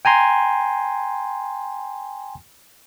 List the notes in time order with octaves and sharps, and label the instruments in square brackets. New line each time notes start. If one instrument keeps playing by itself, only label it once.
[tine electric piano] G5 G#5 A#5 C6